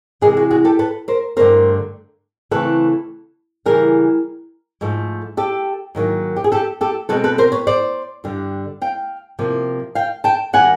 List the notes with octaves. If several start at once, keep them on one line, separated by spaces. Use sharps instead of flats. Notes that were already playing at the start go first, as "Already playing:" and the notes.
C3 E3 G#3 G#4 A#4
F#4 G#4
F#4 G#4
G4 A4
A4 B4
A#4 C5
G2 D3 F#3 A3 C4 A#4 C5
C#3 E3 A3 C4 A4 B4
C#3 E3 G3 G#4 A#4
G#2 F3 A3
G4 A4
G#2 D#3 F#3 A#3
G4
G#4
G4 A4
G4 A4
B2 G#3 C4 A4 B4
A4 B4
A#4 C5
B4 C#5
C5 D5
G2 D3 G3
F5 G5
C3 F3 A#3
F5 G5
G5 A5
D#3 G3 A#3 F#5 G#5